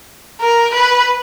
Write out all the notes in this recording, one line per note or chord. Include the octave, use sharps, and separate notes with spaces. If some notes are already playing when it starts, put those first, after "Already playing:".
A#4
B4